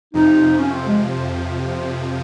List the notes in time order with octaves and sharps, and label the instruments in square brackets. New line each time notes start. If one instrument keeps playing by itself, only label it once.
[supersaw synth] F2 C3 F3 [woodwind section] D#4
[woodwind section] C#4
C4
G#3